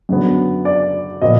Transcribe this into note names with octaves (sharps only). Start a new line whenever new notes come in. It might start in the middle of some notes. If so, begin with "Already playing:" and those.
F#2 D3 F#3 B3 D4
D5
A#2 F3 B3 D#5